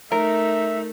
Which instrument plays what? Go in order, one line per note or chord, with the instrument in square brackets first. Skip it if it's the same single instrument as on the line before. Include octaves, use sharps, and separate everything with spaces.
[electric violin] A3 D#4 [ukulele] A#4 [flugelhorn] E5